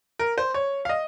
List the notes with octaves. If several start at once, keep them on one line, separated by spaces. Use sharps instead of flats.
A#4
C5
C#5
F5
D#5